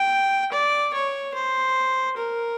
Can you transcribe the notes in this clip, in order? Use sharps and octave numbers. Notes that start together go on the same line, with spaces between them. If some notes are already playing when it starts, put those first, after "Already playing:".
Already playing: G5
D5
C#5
C5
A#4